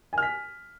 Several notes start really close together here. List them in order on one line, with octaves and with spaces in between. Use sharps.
G#5 F6 B6